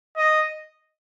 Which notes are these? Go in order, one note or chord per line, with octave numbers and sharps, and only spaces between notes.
D#5